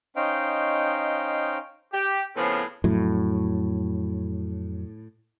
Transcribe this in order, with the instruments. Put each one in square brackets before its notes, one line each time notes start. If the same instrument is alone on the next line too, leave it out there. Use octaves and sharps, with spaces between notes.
[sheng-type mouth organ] C#4 D#4 C5 D#5 F5 G5
[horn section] G4
A2 C#3 F3 B3 C4 G#4
[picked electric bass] F2 F#3 [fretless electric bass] A2